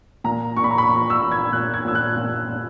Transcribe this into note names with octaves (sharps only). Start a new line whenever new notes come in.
A#2 A#5
A#2 C#6
B5
A#5
B5
A#2 C#6
E6
A#2
G#6
A#2 F#6
G#6
A#2 E6
F#6
A#2
A#2